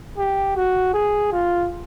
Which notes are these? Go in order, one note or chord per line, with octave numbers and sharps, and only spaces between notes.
G4
F#4
G#4
F4